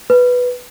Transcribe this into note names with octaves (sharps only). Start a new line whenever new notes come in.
B4